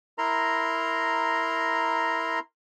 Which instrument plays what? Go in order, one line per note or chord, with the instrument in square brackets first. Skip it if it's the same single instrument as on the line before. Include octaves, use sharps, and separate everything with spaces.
[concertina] E4 A#4 A#5 C6